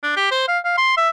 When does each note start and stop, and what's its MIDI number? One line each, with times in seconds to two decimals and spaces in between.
0.03 0.14 62
0.17 0.28 67
0.31 0.47 72
0.48 0.59 77
0.65 0.77 77
0.78 0.94 84
0.97 1.10 76